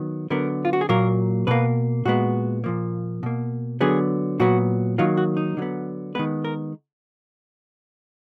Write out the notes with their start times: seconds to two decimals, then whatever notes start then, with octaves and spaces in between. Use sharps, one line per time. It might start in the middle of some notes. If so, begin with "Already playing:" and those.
Already playing: D#3 F#3 B3
0.30 D3 F#3 B3 A#4
0.65 F4
0.73 F#4
0.81 G#4
0.89 A#2 F#3 A#3 A#4
1.47 B2 A#3 B4
2.05 A#2 G#3 B3 F#4
2.64 A#2 F3 A#3
3.23 B2 A#3
3.81 D3 F#3 B3 G#4
4.40 A#2 F#3 B3 F#4
4.98 D#3 F#3 A#3 F4
5.17 F#4
5.37 D#4
5.57 D3 F#3 B3
6.15 D#3 G#3 B3 B4
6.45 A#4